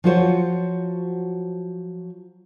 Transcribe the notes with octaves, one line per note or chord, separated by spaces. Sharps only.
F3 F#3 F4 F#4 C5 C#5